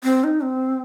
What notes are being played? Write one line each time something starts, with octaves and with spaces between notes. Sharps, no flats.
C4
D#4
C4